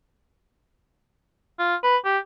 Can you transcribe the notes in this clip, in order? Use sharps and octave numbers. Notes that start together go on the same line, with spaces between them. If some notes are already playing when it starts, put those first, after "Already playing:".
F4
B4
G4